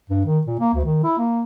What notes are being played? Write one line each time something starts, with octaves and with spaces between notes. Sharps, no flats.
G2
D#3
A#2
A#3
D2
D#3
E4
A#3